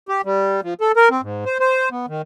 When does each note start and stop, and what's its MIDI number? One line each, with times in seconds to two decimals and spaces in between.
0.09 0.21 67
0.25 0.61 55
0.63 0.74 53
0.81 0.92 69
0.96 1.09 70
1.10 1.21 60
1.23 1.45 44
1.45 1.58 72
1.60 1.89 72
1.91 2.06 59
2.09 2.22 51